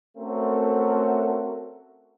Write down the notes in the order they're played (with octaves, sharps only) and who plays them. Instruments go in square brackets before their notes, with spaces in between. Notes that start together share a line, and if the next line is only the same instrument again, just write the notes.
[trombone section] A3 C4 C#4 F#4 A4 A#4